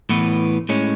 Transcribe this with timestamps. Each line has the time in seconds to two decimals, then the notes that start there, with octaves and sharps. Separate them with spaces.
0.09 A2 E3 B3
0.69 A2 G#3 C#4